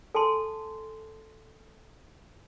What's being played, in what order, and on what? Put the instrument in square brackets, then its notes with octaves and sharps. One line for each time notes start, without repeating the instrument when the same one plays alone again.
[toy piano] A4 G#5 A5 C6